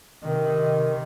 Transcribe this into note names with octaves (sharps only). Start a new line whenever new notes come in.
C3 D#3